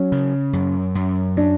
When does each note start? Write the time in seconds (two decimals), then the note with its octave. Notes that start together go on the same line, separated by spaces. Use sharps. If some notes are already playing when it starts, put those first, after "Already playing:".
Already playing: F#3 C#4
0.12 C#3
0.53 F#2
0.95 F#2
1.37 F#3 D4